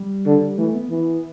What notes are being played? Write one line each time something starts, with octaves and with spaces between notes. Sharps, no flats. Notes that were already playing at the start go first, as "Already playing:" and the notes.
Already playing: G3
D3
E3 A3
B3
E3 B3